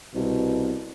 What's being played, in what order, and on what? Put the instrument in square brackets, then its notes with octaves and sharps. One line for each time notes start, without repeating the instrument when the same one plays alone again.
[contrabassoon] C2 [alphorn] B2